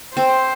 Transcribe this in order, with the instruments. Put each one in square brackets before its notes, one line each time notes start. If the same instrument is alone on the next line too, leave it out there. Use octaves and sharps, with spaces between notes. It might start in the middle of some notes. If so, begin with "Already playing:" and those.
[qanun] C4 [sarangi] C5